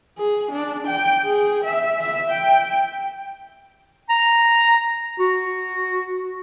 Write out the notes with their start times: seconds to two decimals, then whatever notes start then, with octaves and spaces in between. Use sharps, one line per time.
0.18 G#4
0.52 D4
0.87 G5
1.24 G#4
1.64 E5
2.01 E5
2.30 G5
4.09 A#5
5.20 F#4